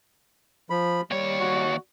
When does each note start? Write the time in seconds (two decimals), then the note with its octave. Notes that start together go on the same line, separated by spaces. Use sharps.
0.70 F3 B5
1.11 D#2 G3 C#5
1.40 F#4